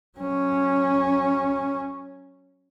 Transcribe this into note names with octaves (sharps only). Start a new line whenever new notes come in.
F#3 C#4